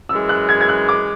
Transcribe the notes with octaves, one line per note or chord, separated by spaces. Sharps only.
F#2 E3 G#3 E6
F#6
G#6
G#6
F#6
D6